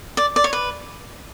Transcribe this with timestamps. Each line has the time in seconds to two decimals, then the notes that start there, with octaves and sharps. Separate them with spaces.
0.17 D5
0.36 D5
0.44 C#5
0.53 B4